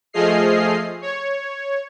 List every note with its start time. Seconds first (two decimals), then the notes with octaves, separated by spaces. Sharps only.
0.13 F3 A3 G#4 D#5 F6 C7
1.02 C#5